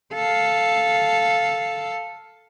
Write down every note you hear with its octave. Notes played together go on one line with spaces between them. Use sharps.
A4 F5